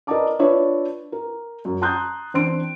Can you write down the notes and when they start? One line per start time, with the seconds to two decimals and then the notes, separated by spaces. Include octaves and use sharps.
0.07 A#4 B4 D5 D#5 A5 D6
0.39 D4 F4 B4 C#5 D5 E5
1.12 A#4
1.65 F#2
1.82 A5 A#5 C6 D#6 F#6 G6
2.34 E3 C4 D4 C6 D7